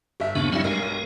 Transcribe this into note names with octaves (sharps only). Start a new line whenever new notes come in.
G1 E5
D#2 C#3 B3 D4
G2 F#3 G3 C4 E4 E5
B1 G2 G#3 A#4